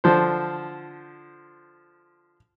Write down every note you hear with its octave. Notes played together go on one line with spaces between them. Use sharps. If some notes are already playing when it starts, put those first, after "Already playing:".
D3 F3 C5